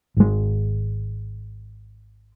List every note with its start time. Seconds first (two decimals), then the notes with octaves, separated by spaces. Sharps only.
0.17 G#1 G#3